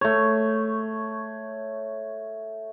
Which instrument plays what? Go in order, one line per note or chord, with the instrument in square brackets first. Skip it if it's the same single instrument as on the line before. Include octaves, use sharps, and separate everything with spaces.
[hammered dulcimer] A3 C#5